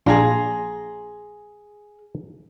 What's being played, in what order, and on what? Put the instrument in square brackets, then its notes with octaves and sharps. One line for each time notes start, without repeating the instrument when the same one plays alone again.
[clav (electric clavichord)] A#1 D4 F4 [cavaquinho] G#4 A#5 C6